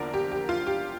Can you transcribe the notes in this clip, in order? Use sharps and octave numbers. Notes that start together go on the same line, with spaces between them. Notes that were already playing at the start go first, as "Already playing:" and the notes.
Already playing: E2 D3 F3 A#3 A#4 D5
G4
G4
F4
G4